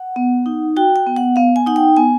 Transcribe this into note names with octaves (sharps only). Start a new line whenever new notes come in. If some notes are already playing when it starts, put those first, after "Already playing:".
Already playing: F#5
B3
D#4
F#4 G5
G5
B3
F#5
B3 F5
G#5
D#4 F#5
G5
B3 G#5